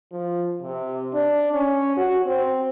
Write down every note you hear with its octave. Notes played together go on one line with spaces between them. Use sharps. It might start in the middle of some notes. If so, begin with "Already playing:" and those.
F3
C3
D4
C#4
F#4
C4